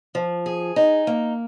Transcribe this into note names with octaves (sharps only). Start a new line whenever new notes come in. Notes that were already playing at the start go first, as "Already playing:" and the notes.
F3
G#4
D#4
A#3